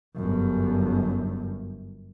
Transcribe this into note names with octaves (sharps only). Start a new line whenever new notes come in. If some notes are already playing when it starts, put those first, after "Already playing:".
G1 F#2